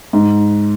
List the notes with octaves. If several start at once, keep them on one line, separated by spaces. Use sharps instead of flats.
G#2